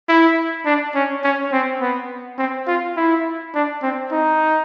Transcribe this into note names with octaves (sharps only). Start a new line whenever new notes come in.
E4
D4
C#4
C#4
C4
B3
C4
F4
E4
D4
C4
D#4